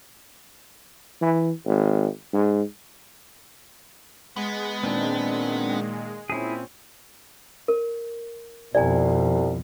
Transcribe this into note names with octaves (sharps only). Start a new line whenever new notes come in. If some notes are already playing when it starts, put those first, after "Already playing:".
E3
G#1
G#2
G#3 B3
A#2 D#3 C4 D4
A#2 C4 C#4 E4 G#4
A#4
C2 F2 B2 D5 G#5